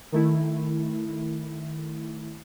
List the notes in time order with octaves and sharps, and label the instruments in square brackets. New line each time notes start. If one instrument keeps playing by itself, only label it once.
[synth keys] D#3 A3 E4